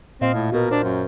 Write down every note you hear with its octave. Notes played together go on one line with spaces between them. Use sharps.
A#2 C4 D#5 F5
A2
B2 F#4 A#4
D4 C5
F#2